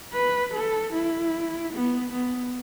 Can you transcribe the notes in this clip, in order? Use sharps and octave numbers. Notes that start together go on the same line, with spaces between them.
B4
A4
E4
B3
B3